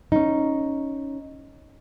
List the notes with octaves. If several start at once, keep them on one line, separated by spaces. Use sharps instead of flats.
C#4 D#4